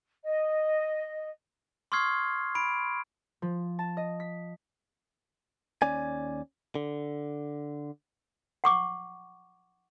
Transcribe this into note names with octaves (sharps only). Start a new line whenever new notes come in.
D#5
C6 C#6 D#6 F6 G#6 C7
B5 D7
F3
A5
D#5
B6
D#2 C#4 D5 G#5
D3
F#5 C#6 D6